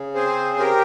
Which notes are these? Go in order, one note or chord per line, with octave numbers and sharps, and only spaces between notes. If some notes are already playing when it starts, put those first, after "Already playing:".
Already playing: C#3
C4 G#4 C5
C#3
G4 A#4